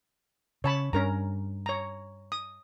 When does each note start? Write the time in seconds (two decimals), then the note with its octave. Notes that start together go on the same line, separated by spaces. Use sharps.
0.64 C#3 C#5 A5 B5
0.93 G2 C#4 A#4 A#5
1.66 C#5 A#5
2.32 D#6